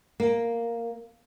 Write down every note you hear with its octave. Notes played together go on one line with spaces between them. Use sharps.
A#3